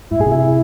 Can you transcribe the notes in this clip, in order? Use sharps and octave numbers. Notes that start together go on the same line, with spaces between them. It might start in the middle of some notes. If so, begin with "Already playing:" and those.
G#2 E4
A2 G#4
C3
E4